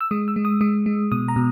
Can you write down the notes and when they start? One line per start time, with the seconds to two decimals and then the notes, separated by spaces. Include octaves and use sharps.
0.01 E6
0.11 G#3 D#6
0.28 E6
0.36 G#3
0.45 D#6
0.61 G#3 D#6
0.86 G#3
1.12 B2 D#6
1.28 A#5
1.36 B2